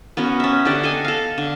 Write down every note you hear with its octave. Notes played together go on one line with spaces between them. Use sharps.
B3 C#4 F#4 A#4
C#4 E5
D3 G4 D5 F#5
A4 D#5 G#5
A4 F5
D3